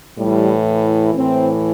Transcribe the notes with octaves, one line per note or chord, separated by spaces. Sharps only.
A2 E3 G3
A2 E3 C4